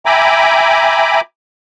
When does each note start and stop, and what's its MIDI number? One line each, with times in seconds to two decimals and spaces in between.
0.06 1.21 76
0.06 1.21 79
0.06 1.21 80
0.06 1.21 82
0.06 1.21 83
0.06 1.21 86